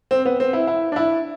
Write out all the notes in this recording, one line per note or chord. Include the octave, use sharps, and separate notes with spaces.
C4
B3
C4
E4
E4
D4
E4